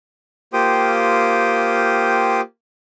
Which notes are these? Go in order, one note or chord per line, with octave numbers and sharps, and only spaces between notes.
A#3 F4 G4 C5 G5 D#6